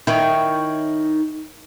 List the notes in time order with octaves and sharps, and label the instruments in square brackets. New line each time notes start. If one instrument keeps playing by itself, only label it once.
[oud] D#3 E4 [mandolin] C#5 G5